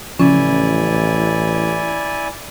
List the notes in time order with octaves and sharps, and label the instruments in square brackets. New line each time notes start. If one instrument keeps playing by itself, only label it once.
[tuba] A1 [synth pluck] C#3 F3 [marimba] C#4 [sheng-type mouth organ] E4 D5 G#5